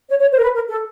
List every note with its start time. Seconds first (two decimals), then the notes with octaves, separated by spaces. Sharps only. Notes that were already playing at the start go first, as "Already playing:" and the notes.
0.09 C#5
0.20 C#5
0.32 C5
0.38 A#4
0.42 B4
0.54 A#4
0.69 A4